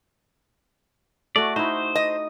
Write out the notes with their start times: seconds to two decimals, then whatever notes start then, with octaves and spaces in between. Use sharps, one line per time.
1.36 A3 F#4 D5
1.56 D#4 E4 C5
1.95 D#5